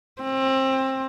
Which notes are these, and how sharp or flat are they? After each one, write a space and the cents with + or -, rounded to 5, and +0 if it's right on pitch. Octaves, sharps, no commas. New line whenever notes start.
C4 +25